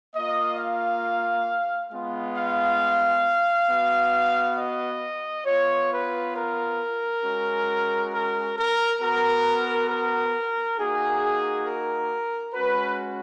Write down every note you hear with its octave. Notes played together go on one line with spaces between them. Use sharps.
A#3 F4 D#5
F5
G#3 B3 F4
F5
B3 F#4
D#5
B3 F4 C#5
B4
A#4
G#3 C#4 F#4
A#4
A#4
B3 F#4 A#4
A#4
A#3 D#4 F#4 G#4
A#4
G#3 C#4 F#4 B4